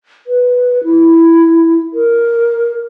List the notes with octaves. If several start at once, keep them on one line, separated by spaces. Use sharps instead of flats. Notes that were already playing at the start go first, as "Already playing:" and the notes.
B4
E4
A#4